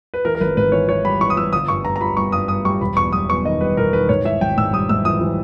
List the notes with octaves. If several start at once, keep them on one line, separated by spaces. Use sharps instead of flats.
B4
E3 A#4
A#4
G#1 B4
G#2 B4
E3 C#5
E3 C#5
G3 B5
E3 C#6
D#6
E3 E6
G1 D#6
G2 C#6
G2 A#5
A#5
G3 B5
G3 C#6
G2 D#6
G2 D#6
G3 C#6
E1 B5
E2 C#6
G3 D#6
E2 C#6
D#3 D#5
G3 B4
E1 A#4
D#3 B4
G#2 C#5
E3 E5
G#1 G5
G#2 E6
G3 D#6
G#2 E6
E3 D#6
E3